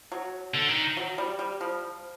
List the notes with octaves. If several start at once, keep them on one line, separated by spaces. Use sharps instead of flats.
F#3
D3
D#3
F#3
G3
G3
F3